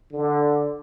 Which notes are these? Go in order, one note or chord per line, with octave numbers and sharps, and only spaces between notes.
D3